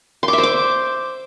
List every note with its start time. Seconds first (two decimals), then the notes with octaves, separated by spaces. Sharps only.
0.23 C6
0.28 D6
0.33 E5
0.38 C5
0.43 D6